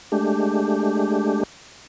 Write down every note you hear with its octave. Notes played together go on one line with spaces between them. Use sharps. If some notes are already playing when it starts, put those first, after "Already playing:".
G#3 A3 D4 G4